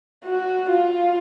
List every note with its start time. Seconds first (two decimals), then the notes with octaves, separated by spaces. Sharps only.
0.25 F#4
0.72 F4